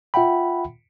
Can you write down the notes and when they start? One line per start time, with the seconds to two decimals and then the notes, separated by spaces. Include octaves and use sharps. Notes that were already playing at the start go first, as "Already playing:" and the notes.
0.14 F4 E5 F#5 G5 B5